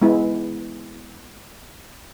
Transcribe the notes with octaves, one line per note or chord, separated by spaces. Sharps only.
G#3 B3 E4